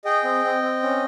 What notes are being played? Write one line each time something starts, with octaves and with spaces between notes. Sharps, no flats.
G#4 D#5 G5
C4
C4
C4
C#4